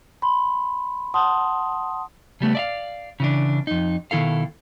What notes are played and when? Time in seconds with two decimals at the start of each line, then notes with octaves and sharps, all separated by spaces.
0.22 B5 C6
1.14 F#5 A5 C6 D#6
2.41 C#3 G3 A3 B3
2.55 D5 E5 F5
3.20 C#3 E3 D4
3.67 F2 D#4
4.11 B2 D#3 E4 A4 F5